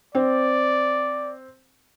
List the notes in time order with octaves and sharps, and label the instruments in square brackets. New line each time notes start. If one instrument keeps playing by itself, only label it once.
[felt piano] C4 [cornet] D5